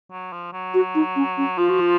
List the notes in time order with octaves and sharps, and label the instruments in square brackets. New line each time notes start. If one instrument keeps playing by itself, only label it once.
[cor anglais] F#3
F3
F#3
[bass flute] F#4
D#4
C#4
C#4
[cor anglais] F3 [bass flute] F4
[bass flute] F#4
F4